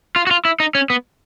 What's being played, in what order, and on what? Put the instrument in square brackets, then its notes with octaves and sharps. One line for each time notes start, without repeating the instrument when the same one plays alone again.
[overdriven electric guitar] F4
F#4
F4
E4
D#4
C#4
B3